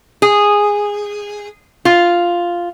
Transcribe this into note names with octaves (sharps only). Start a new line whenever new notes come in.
G#4
F4